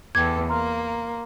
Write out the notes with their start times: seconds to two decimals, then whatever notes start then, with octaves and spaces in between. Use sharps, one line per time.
0.15 E2 A4 G5 D6 G#6
0.49 A#3 A#5 C6 F6